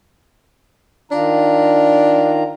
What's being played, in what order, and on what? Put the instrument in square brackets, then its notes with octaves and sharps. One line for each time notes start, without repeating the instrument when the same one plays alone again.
[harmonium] D#3 F4 A#5 [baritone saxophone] D4